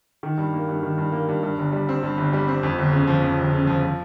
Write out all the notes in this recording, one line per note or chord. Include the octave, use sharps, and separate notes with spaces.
D#3
G2
A#3
G2
D#3
G2
A#3
G2
G2
G1
G3
C4
G2
G1
G3
C4
F2
G1
C#3
F3
F2
G1
C#3
F3
F3